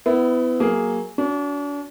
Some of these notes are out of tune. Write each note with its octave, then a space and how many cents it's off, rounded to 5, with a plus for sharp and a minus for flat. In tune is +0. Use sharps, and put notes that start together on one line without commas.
B3 +30 E4 +0
F#3 +0 A#3 +0 G#4 +0
D4 -40 F#4 +0